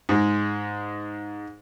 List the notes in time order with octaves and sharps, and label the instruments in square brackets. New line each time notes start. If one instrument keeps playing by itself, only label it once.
[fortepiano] G#2 G#3